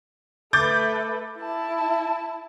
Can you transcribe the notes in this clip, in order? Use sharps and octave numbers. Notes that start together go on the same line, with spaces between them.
A3 B4 D6 G6 A6
E4 A5